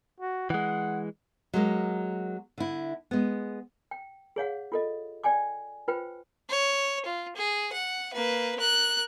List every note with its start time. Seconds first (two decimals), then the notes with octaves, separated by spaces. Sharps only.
0.20 F#4
0.50 E3 G#3 F#5
1.53 F#3 G#3 A#3
2.58 D3 E4
3.11 G#3 B3
3.91 G5
4.36 G#4 C#5 F5 F#5
4.72 F4 A4 D#5
5.24 D5 G5 G#5 D6
5.88 F4 B4 C5 G5
6.49 C#5
7.05 F4
7.36 G#4
7.72 F#5
8.13 A#3 B4
8.59 A#4 F#6